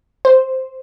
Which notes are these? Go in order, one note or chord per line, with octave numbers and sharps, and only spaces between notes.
C5